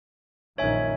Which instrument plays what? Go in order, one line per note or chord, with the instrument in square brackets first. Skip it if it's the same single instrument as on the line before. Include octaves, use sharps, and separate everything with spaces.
[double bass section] A#1 F#2 D#3 [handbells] C#5 E5 G#5